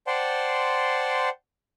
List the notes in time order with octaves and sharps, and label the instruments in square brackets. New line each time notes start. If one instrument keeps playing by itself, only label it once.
[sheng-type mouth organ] C5 D5 F#5 G5 A5 C6